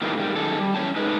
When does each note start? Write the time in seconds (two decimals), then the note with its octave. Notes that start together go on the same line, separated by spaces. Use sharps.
0.02 A#2 D#3 E3 G3 A3 A#3
0.17 G#2 D#3 G3
0.36 F#2 D#3 G#4 A4
0.59 G3
0.75 E3 C#4 C#5 G5 A5
0.96 G#3 A3 D#4 B4